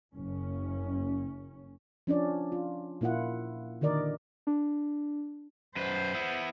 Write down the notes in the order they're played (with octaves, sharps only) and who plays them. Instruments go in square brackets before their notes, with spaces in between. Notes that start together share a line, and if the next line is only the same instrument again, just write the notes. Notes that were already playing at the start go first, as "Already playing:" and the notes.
[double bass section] F#1 C#4
[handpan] F3 C#4 D4 D5
F4
A#2 A#3 E4 F4 F#5
D3 D#3 A#4 D5 D#5
[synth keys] D4
[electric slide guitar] F#2 B4 [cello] C5
[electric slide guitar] B3 E4